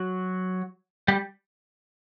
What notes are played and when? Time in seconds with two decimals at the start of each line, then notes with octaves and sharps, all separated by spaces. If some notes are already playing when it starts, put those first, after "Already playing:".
Already playing: F#3 F#4
1.08 G3 G4